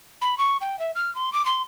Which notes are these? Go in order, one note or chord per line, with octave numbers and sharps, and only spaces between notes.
B5
C#6
G5
E5
F6
C6
D6
C6